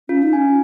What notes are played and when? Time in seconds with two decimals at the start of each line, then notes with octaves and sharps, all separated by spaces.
0.09 C#4 F4
0.23 D#4
0.33 C#4 G#5